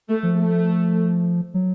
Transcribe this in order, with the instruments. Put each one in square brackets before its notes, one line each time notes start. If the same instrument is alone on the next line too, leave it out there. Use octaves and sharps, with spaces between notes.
[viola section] A3
[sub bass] F3
[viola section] A3
[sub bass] F#3